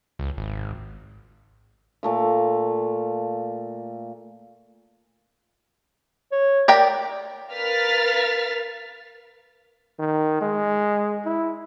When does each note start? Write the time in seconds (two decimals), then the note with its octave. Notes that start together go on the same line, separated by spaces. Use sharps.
0.19 C#2
0.37 G#1
2.03 A#2 A3 F5
6.32 C#5
6.68 G4 A#4 D5 G5
7.53 A#4 B4 F5 F6 A6 B6
9.99 D#3
10.41 G#3
11.25 E4